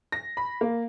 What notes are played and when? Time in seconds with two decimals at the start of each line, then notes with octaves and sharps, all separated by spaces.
0.12 A#6
0.37 B5
0.61 A#3